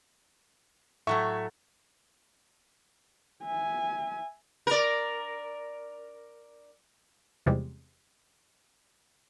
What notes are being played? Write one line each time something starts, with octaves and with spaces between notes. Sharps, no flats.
A2 F#3 A3 E5 C#6
E5 G#5
A#4 D5
E2 C3 F3 G3 G#3